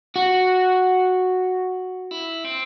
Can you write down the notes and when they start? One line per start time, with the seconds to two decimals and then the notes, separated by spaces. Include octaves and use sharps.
0.16 F#4
2.11 E4
2.44 C4